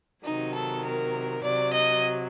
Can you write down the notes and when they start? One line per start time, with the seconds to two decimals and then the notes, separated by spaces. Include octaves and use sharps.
0.24 C3 D#3 F#3 D#4
0.54 A4
0.83 A#4
1.42 C3 F#3 D5
1.71 D#5